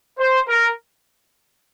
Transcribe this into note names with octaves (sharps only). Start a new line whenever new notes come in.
C5
A#4